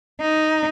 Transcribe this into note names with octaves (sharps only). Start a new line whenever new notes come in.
D#4